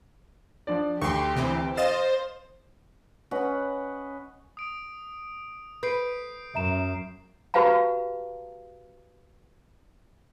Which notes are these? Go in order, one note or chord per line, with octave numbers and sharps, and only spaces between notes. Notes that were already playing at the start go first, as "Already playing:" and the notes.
F3 D4 D5
D2 G4 C6 C#6
C3 E3 C4
C5 D#5 F5 A6 E7
C#4 B4 D#5 F#5
D#6 D7
B4 G6 C7 D7
F#2 E5 A#5 E7
F#4 G4 B4 F5 A5 A#5